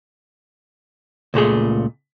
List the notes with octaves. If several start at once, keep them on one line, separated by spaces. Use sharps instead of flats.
C#2 A#2 A3 G#4